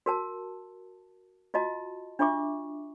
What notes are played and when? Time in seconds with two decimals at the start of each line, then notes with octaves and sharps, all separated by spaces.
0.06 F#4 A#4 A5
1.54 F4 F#4 D#5 A5
2.19 D4 F4 E5 C#6 D6